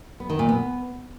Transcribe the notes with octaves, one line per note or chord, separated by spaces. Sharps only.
B3
D#3
A#2
B3